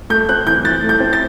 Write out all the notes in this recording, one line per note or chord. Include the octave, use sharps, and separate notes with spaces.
A3 G6
C4 F#6
E3 G6
E4 A6
A3
G6
C4
A6